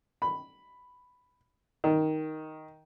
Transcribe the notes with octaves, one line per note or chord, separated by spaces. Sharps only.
B5
D#3